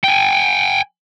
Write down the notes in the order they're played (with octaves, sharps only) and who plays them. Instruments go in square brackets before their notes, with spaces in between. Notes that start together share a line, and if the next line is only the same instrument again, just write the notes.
[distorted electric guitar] G5 G#5